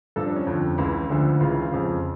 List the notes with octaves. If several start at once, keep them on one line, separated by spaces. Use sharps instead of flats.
G2 F3 A4
D4
C#4
F2 D3 F3
C#2 C#3 E3 E4
D2 D3 F3
C#2 C#3 E3 F4
F2 C#3 F3